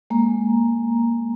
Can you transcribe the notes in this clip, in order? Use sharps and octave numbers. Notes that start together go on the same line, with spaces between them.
G#3 A#3 A#5